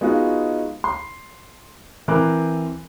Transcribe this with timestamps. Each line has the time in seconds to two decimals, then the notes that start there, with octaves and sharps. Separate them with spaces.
0.01 G#3 B3 D#4 F4 F#4
0.84 C6
2.08 E3 C4 A#4 C5 D6 F#6